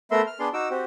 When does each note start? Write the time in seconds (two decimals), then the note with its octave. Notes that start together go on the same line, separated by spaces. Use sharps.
0.11 A3 B3 A#4 E5 C6
0.27 F6
0.39 B3 D4 G#4 D5 C6
0.53 D#4 F#4 D6 E6
0.70 C4 F#4 G4